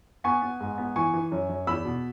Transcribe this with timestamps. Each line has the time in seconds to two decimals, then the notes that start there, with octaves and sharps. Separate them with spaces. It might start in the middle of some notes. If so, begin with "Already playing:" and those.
0.24 B3 G#5 C#6
0.42 B3
0.61 G#2
0.78 B3
0.96 E3 G#5 C#6
1.13 E3
1.32 F#2
1.49 F#2
1.67 E2 B5 E6
1.85 B2